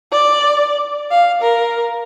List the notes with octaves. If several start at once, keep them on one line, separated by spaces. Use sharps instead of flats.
D5
F5
A#4